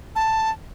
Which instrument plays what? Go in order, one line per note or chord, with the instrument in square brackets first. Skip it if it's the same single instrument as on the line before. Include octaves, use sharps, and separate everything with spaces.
[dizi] A5